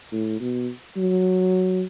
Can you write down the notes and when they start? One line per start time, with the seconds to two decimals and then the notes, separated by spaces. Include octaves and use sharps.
0.12 A2
0.40 B2
0.97 F#3